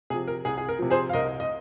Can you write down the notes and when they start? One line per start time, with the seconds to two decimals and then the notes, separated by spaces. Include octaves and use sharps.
0.10 C3 F3 G#4
0.28 A#4
0.45 C2 G#4
0.58 G#4
0.69 A#4
0.79 C3 F3
0.90 G#4 C5
1.09 F5
1.13 C2 A#4 D#5
1.40 D#5